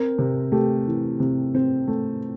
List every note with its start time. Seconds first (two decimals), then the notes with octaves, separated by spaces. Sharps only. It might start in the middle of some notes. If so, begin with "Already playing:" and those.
Already playing: C4 A#4
0.19 C3
0.52 A3 G4
0.87 E3
1.20 C3
1.55 C4
1.88 A3